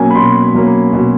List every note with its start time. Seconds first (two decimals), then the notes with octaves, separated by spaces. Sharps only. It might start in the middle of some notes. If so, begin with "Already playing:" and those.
Already playing: B2 F#3 A#3 C#4 G#5
0.10 B5
0.15 B2 C6
0.54 F#3 A#3 C#4
0.93 B2